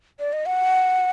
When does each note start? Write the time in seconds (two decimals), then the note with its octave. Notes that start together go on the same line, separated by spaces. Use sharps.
0.20 D5
0.33 D#5
0.46 F#5